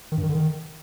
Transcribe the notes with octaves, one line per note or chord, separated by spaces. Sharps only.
D#3
G2
D#3
D3
D#3